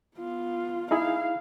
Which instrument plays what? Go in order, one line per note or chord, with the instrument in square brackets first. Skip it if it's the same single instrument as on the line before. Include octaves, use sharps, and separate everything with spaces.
[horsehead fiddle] B3 F4
[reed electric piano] D#4 E4 G#4 [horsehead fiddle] F5